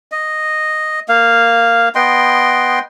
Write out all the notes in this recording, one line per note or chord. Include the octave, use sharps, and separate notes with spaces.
D#5
A#3 F5
B3 D#5 G5 C6